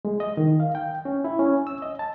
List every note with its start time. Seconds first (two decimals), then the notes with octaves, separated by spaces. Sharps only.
0.05 G#3
0.20 D#5
0.37 D#3
0.60 F5
0.75 G5
1.05 C#4
1.24 E4
1.39 C#4
1.67 E6
1.82 D#5
1.99 A5